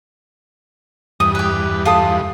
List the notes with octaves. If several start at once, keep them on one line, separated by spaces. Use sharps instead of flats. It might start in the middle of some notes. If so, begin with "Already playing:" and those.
E2 G2 D#6
G4 B4
F4 A4 D#6